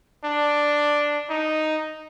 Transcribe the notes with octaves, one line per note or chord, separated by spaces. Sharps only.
D4
D#4